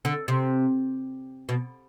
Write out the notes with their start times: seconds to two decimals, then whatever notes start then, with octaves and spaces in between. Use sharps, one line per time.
0.05 D3
0.28 C3
1.49 B2